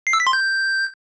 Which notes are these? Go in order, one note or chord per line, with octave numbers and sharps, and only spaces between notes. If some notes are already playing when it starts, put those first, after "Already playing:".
C7
E6
B6
C6
G6